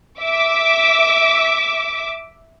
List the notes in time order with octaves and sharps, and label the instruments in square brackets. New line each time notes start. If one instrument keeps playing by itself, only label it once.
[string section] E5 D6